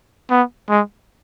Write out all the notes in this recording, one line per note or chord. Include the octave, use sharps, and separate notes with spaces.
B3
G#3